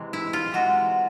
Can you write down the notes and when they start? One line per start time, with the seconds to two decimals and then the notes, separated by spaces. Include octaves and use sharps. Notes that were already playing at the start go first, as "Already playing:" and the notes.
Already playing: C3 E3 G#3
0.13 E4
0.33 F4
0.52 C3 E3 G#3 F#4